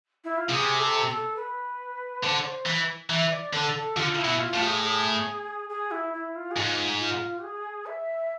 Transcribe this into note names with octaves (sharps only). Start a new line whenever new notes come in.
E4
F4
C3 G#4
A4
A4
B4
D3 C5
D5
C5
E3
E3 E5
D5
D3 A4
A4
D3 F4
E4
B2
F4
A2
G#4
G#4
G#4
E4
E4
F4
G#4
G#2 F4
F4
G#4
E5